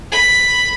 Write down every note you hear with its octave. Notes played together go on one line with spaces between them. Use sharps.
B5